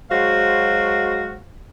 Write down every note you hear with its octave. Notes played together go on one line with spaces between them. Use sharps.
F#3 G#3 F#4 C5 F5